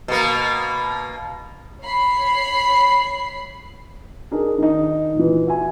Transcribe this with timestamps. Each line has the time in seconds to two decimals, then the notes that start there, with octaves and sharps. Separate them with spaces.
0.08 B2 A#3
1.84 C#5 B5 C7
4.31 D4 D#4 G#4 A#4
4.58 D#3 D4 D#4
5.15 A#2 E3
5.47 F#4 E5 G#5